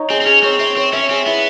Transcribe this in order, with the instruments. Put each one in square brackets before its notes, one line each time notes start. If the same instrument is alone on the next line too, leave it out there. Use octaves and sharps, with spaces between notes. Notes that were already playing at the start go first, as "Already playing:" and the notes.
Already playing: [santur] D#4 C#5
[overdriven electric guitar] C4 [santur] G#4
[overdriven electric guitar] C4
[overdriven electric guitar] C#4 [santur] G#4
[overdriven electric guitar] C4 [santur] C#5
[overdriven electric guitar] C4 [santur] E5
[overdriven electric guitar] C4 [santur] C#5
[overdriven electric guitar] C#4 [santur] E5
[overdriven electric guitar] C4 [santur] G#4
[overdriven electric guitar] B3 [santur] E4